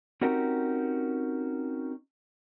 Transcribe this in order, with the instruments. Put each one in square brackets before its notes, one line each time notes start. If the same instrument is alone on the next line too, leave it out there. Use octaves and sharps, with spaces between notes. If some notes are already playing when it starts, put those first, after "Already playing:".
[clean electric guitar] C4 C#4 D#4 F#4 G4 A#4